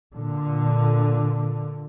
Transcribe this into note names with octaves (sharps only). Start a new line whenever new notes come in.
A#2 D3